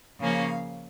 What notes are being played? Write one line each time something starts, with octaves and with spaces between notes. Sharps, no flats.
C#3 F3 A#3 C#4 F5